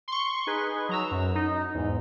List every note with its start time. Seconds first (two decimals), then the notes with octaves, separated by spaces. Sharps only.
0.08 C6 C#6
0.47 D#4 G#4 B4
0.89 F#3 A#5 E6
1.11 F#2
1.35 D#4
1.75 E2 G#2